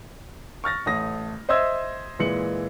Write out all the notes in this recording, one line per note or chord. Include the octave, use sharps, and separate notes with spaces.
C#6 F6 A6 A#6
A1 A3 D#6 A#6
C5 D#5 E5 C6 E6 G#6
A#2 E3 G#3 C#7 F#7